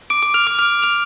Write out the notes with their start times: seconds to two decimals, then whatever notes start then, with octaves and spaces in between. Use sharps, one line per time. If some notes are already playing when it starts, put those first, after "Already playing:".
0.10 D6 D7
0.23 D6 D7
0.34 F6 F7
0.47 D6 D7
0.59 F6 F7
0.83 F6 F7